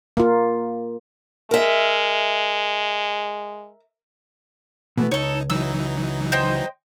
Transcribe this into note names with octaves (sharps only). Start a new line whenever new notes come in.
A#3 F4
G#3 A#4 E5
B2 E3 A3 B3
C#2 D#4 A4 C#5
E3 F#3 D#4 E6
C5 D#5 G5